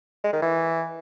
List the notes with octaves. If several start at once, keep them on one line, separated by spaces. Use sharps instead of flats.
G#3
D#3
E3